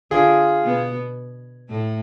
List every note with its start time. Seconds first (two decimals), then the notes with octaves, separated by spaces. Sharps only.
0.11 D3 F4 G#4
0.64 B2 B3
1.69 A2 A3